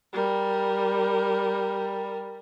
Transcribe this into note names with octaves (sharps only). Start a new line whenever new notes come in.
G3 A#4